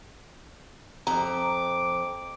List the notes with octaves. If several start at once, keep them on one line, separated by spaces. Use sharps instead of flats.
F2 A#5 D6